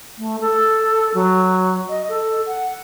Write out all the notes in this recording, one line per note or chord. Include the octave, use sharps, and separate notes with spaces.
A3
A4
F#3
D#5
A4
F#5